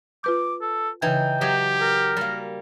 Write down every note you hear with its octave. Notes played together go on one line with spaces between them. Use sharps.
F4 B4 D6 G6
A4
C#3 E3 D#4 G5 G#6
F#3 G4 D#6 G#6
A#4
G3 A#3